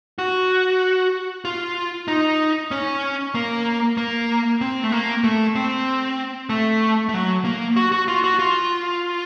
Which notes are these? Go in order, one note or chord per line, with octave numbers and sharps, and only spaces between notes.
F#4
F4
D#4
C#4
A#3
A#3
C4
A3
A#3
A3
C4
A3
A3
F#3
A#3
F#4
F#4
F4
F#4
F4